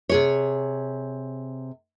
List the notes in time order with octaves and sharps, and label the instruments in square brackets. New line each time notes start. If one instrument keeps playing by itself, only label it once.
[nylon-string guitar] C3 G#4 C#5